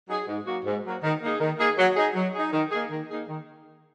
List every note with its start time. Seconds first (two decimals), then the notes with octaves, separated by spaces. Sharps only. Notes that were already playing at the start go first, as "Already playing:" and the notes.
0.09 F#3 D#4 G#4
0.28 G#2
0.47 F#3 A#3 F#4
0.66 G#2
0.84 F#3 A#3 F#4
1.03 D#3
1.21 A#3 D#4 G#4
1.40 D#3
1.59 A#3 D#4 G#4
1.78 F#3
1.97 D#4 G#4
2.15 F#3
2.34 D#4 G#4
2.53 D#3
2.72 A#3 D#4 G#4
2.91 D#3
3.09 A#3 D#4 G#4
3.28 D#3